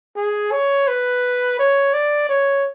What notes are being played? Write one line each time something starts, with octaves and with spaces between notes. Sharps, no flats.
G#4
C#5
B4
C#5
D5
C#5